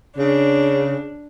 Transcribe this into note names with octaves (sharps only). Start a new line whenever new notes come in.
C#3 D4